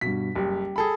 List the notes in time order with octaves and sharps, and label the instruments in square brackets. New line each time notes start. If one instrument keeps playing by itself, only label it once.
[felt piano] G2 B2 [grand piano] B6
[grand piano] F#1 [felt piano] G3 G4
[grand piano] G#4 A4 B5